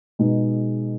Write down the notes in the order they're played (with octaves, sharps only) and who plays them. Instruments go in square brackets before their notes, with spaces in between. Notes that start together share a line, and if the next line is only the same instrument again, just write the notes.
[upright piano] B2 G#3 D#4 G#4